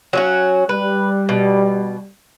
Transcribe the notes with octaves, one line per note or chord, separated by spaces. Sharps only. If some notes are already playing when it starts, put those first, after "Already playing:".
F#3 C#4 F#4
G3 B4
B2